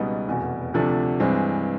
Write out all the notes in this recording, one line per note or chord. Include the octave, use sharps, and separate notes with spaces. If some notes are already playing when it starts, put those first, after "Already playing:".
Already playing: C#2 B2 G3 B3 D#4
F1 E2 B2
D2 C3 F3 A3 D4
G2 E3 G#3 C4